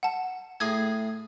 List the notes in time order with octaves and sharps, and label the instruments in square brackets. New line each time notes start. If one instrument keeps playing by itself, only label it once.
[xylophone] F#5 A5
[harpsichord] A2 G#4 [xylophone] D#6 G#6